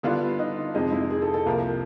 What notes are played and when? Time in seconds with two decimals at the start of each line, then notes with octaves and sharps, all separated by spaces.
0.03 D3 G3 B3 D4 E4 F4
0.39 D#4
0.74 F2 C3 F3 G#3 D#4
0.92 E4
1.10 G#4
1.22 A4
1.34 A4
1.46 C2 C3 F3 A#3 A#4